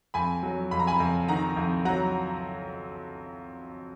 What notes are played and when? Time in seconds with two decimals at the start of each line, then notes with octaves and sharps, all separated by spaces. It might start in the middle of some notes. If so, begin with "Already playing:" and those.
0.14 F2 G#5 B5
0.43 F#3
0.71 F2 B5
0.79 A#5
0.87 G#5 B5
1.00 F2
1.28 D#3 F#5 A#5
1.57 F2
1.85 F#3 F#5 A#5